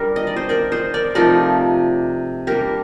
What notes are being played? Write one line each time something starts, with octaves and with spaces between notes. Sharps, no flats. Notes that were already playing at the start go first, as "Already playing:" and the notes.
Already playing: G3 D4 A#4
D#5
D5
C5 D#5
A#4 D5
C5 D#5
A#4 D5
C3 F3 A3 D#4 A#4 D5
G3 A#3 D4 G4 A#4